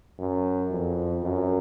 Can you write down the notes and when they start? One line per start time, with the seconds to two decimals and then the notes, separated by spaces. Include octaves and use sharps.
0.19 F#2
0.71 F2
1.23 F#2